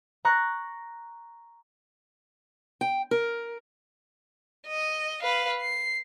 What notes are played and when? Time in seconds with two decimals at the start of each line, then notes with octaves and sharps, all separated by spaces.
0.25 A#5 C#6 F#6
2.81 G5
3.11 A#4
4.68 D#5
5.23 B4 F5
5.61 C7